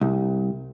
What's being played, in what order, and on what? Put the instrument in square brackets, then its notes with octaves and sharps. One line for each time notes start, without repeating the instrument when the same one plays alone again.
[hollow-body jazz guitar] C2